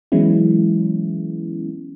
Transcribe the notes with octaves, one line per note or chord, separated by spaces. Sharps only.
E3 F#3 G#3 B3 C#4 E4